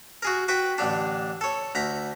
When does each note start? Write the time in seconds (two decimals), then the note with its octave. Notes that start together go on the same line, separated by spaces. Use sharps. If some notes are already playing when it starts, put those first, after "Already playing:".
0.22 F#4 G#4 A#4
0.48 F#4 B4 G5
0.78 A1 D3 D4
1.41 A4 C#5
1.75 D2 A#5 B5